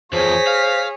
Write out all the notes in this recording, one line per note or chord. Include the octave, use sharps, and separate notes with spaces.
E2 F3 G#4 C5 C#5 A#6 B6
F5